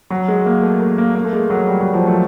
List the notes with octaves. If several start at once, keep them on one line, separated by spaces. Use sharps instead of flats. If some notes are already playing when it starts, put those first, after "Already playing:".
F#3
G#3
A#3
A3
A#3
A#3
A#3
A3
G#3
F#3
G3
F#3
F3
A3